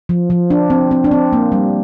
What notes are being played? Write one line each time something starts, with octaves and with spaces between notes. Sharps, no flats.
F3
F3
D4
C4
C4
D4
C4
A#3
G3